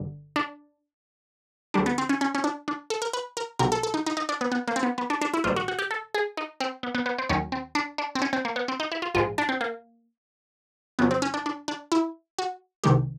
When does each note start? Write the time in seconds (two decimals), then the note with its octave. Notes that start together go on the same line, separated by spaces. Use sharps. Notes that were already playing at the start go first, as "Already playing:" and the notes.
Already playing: G1 G2 D3 G3
0.36 D4
1.74 D2 D3 G3 D4
1.86 B3
1.98 C4
2.09 C#4
2.21 C#4
2.35 C#4
2.44 D4
2.68 D4
2.90 A4
3.02 A#4
3.13 B4
3.37 A#4
3.59 B1 B2 G3 A#4
3.72 A4
3.83 A4
3.94 D#4
4.06 D#4
4.17 D#4
4.29 D4
4.41 B3
4.52 B3
4.68 A#3
4.76 C4
4.83 B3
4.98 B3
5.10 D4
5.21 D4
5.34 E4
5.44 A#1 G#2 D#3 G3 F4
5.56 F#4
5.68 F#4
5.79 G4
5.91 A4
6.14 G#4
6.37 D#4
6.60 C4
6.83 B3
6.95 B3
7.06 B3
7.18 C4
7.29 D#2 D#3 F#3 C#4
7.52 C4
7.75 D4
7.98 D4
8.15 C4
8.22 C#4
8.33 C4
8.45 A#3
8.56 B3
8.68 C4
8.80 D#4
8.92 E4
9.02 F4
9.14 A#1 G#2 F3 G#3 F4
9.38 D4
9.49 C4
9.61 A#3
10.99 F2 C#3 F#3 B3
11.11 C4
11.22 C#4
11.34 D4
11.46 D4
11.68 D4
11.92 E4
12.39 F#4
12.84 C2 C3 D#3 G#3 G4